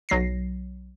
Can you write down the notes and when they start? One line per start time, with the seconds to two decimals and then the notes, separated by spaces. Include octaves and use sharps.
0.09 B1 F#3 A#6 C7